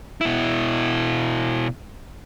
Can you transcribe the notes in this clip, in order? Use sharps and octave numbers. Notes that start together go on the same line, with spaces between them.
B2 E4